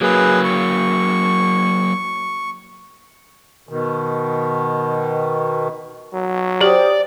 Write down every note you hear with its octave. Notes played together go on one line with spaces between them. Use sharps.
F#3 A#3 G#4 B4
C#6
B2 D#3
F#3
G4 C5 D5 G5 D#6